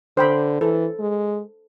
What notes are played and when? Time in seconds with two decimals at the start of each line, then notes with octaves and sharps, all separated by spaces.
0.17 D3 C5 G5 B5
0.61 E3 A4
1.00 G#3